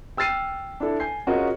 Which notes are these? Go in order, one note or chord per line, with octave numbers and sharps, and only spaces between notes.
G5 E6 F6 A6 C7 D#7
D4 E4 A4
G#5 G6 C7
C#4 F4 F#4 G#4 A#4 D#5